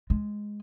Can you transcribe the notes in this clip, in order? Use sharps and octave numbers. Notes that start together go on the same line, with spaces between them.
G#3